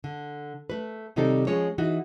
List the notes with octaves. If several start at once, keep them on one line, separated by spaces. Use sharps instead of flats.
D3
A3 B4
C3 D#3 G3 C4 D#4 A4
F3 G#3 C#4 C#5
E3 D#4 F#4